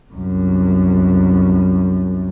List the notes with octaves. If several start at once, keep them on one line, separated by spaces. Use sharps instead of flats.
C2 F#2